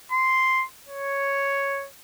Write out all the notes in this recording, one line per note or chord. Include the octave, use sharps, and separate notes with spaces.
C6
C#5